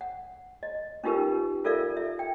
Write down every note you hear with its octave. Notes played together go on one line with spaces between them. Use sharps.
F#5
D#5
C#4 D#4 F4 G4 A#4 B4
F4 A4 A#4 D5 E5 F5
E5
G5